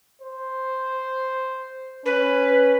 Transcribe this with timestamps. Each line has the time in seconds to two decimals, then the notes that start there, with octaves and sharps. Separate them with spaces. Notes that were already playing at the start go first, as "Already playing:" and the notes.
0.21 C5
2.06 C#4 B4